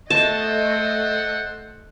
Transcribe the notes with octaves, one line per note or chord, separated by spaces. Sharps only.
A3 A4 C5 D#5 F#5 A5